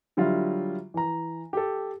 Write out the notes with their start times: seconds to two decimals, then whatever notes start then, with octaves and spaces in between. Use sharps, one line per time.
0.17 D3 F#3 G3 E4 F4
0.94 E3 A#5
1.53 G4 A4